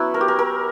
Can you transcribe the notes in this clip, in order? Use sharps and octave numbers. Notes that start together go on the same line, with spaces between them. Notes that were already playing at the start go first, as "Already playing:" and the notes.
Already playing: F#3 B3 C#4 E4
A#4
G4
A#4
A#4